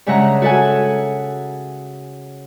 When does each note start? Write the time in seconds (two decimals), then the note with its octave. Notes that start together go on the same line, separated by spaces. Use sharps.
0.06 G2 C#3 G#3 E5 F#5 A#5
0.42 F#4 A4 E5 F#5 G#5